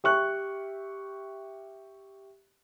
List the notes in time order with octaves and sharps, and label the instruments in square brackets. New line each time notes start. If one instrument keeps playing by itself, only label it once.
[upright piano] G4 E5 C#6 F#6